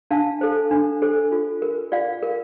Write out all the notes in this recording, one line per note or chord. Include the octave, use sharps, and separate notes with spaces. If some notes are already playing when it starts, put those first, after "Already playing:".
D4 F5 A5
A4 C5
D4
A4 C5
F4
A#4
F4 D5 F5
A#4